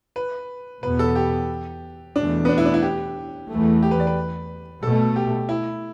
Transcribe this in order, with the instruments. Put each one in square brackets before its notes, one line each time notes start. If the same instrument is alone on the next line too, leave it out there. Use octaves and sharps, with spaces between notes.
[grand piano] B4
[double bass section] E2 B2 B3 [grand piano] B4
[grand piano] A4
G4
[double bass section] E2 B2 A3 [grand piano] D4
[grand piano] B3
D4
E4
D4
E4
G4
[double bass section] E2 E3 A3
[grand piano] G4
B4
D5
B4
[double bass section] B2 A3 [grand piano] A4
[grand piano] G4
E4